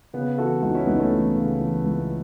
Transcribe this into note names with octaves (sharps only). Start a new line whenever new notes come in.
C#3 B3
E3 F#4 A4
C#2 D#4 F#4
C#4 E4
C#2 B3 D#4
A3 C#4
E3
C#3
E3
C#2